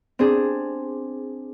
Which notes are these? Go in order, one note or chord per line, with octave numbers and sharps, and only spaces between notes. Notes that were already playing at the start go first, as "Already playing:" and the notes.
C4 D4 G#4